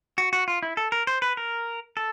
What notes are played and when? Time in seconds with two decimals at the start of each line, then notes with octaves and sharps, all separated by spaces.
0.18 F#4
0.33 F#4
0.48 F4
0.63 E4
0.77 A4
0.92 A#4
1.07 C5
1.22 B4
1.37 A#4
1.97 A4